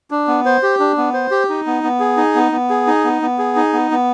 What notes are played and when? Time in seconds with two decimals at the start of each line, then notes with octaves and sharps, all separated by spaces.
0.11 D4
0.28 B3
0.46 C5
0.63 G4
0.80 D4
0.97 B3
1.14 C5
1.31 G4
1.49 D#4
1.67 B3
1.83 B3
2.00 G#4
2.17 D#4
2.35 B3
2.52 B3
2.70 G#4
2.87 D#4
3.04 B3
3.22 B3
3.39 G#4
3.56 D#4
3.73 B3
3.91 B3